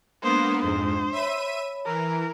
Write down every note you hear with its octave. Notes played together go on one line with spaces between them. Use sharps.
G#3 A#3 B3 D4 C5 D#6
F2 G#2 C5
C#5 E5 B5 D#7
E3 A#4